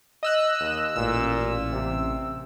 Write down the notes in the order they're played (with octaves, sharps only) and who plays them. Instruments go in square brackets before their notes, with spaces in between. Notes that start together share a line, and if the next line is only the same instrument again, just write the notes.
[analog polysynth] D#5 E6 F#6
[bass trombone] D#2
[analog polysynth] A1 E6 [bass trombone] A#2
[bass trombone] C3